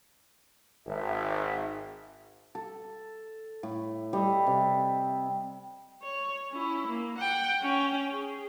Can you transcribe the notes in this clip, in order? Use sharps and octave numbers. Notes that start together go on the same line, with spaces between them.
G#1 E5
A4
A2
G3 D#5 E5
C3
C#5
C#4 E4
A#3
F#5 G5
C#4 G5
G#4